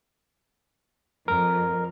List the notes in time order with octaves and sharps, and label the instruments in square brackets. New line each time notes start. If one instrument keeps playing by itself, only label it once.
[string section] F2 [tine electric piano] A#4